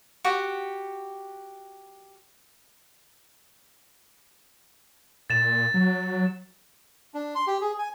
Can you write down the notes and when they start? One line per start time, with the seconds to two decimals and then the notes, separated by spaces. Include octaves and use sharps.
0.24 F#4 G4 F#5
5.30 A#2 A6 E7
5.74 F#3
7.14 D4
7.35 C6
7.47 G4
7.61 G#4
7.78 G#5